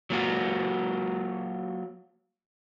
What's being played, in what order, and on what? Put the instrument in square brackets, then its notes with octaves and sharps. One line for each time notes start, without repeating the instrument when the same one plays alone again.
[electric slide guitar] F#3 A#3 F4 F#4